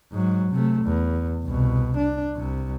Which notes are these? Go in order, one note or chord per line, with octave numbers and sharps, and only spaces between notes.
G#2 F#3
C3 A3
E2
C2 B2
D4
C2 C3